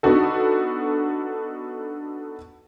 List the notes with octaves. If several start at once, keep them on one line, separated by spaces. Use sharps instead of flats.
B3 D4 D#4 F#4 A4